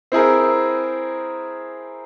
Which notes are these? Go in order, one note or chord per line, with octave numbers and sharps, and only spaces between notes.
C4 E4 G#4 A#4